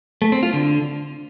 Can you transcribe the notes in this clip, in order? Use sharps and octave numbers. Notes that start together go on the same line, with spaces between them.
A3
C4
F4
D3